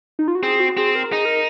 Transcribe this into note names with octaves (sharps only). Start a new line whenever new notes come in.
D#4
F4
F#4
C4 G#4
F#4
C4 G#4
A#4
D#4 G#4
A#4